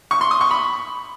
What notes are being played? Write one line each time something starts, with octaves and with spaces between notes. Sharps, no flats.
C#6
C6
D#6
C#6
B5